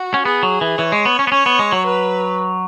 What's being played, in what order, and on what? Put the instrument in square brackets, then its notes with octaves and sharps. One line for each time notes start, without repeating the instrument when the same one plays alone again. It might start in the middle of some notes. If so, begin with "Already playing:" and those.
Already playing: [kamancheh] F#4
[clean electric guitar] C#4
[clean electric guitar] B3 [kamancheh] G#4
[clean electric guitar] F#3
E3
[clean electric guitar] E3 [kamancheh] C#5
[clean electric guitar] G#3
B3
C#4
B3
[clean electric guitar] C#4 [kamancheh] C#5
[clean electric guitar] B3
G#3
F#3
[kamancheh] B4